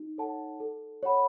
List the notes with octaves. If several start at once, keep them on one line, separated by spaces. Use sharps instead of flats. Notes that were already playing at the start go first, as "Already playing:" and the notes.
Already playing: D#4
A4 C#5 F#5 A5
A4
C#5 F#5 B5